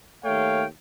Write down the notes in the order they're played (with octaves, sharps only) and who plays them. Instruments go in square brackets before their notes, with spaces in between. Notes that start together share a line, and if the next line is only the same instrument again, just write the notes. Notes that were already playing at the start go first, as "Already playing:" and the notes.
[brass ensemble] D#2 A3 C#5 F5 G5